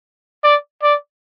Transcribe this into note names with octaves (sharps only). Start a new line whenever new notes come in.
D5
D5